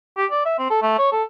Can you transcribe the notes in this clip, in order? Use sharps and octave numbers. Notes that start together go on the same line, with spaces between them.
G4
D5
E5
C4
A4
A3
C#5
A4